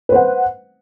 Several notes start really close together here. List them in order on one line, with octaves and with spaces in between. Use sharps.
B4 C5 F#5